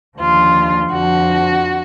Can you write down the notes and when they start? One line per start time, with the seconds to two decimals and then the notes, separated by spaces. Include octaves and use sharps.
0.19 D#2 D3 F3 F4
0.93 F2 D3 F3 F#4